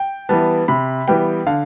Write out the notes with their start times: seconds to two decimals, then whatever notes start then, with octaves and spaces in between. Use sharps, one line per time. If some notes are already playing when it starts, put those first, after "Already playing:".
Already playing: G5
0.29 E3 G3 B3 A5
0.68 C3 B5
1.08 E3 G3 B3 G5
1.47 D3 F5